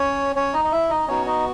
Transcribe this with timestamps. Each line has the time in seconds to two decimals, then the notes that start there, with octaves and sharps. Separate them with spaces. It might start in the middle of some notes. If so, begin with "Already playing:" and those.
Already playing: C#4 C#5
0.36 C#4 C#5
0.54 D#4 D#5
0.65 D#5
0.72 E4 E5
0.90 D#4 D#5
1.08 B3 C#4 D#4 F#4 C#5
1.26 D#4 D#5